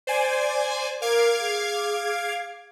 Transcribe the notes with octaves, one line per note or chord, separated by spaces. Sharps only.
C5 D5 G#5
A#4 F5 D6 G#6
G#4